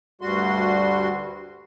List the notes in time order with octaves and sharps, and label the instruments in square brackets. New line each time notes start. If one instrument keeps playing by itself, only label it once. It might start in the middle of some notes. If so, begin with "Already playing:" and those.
[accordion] D2 G2 G3 F#4 C6